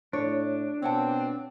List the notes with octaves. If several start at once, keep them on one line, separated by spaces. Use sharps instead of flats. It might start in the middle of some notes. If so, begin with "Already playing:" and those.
A2 D4 C#5
B2 C4 C#5 F#5 A5